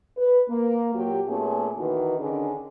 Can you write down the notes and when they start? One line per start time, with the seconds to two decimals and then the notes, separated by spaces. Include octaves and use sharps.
0.17 B4
0.48 A#3
0.94 A#2 F#3 F#4 G4
1.28 A#2 A3 B3 C#4 G#4
1.78 D#3 E3 D#4 F#4 B4
2.19 D3 D#3 C#4 D4 G#4